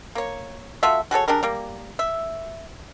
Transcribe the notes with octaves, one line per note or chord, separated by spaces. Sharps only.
A#3 C#5
A3 F4 F#4 E5
F#4 G#4 A4 C#5
D4 G4 G#4 A#4
G3 A#3
E5